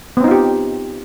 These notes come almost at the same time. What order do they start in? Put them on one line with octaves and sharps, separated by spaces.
B3 C4 D#4 F4 G4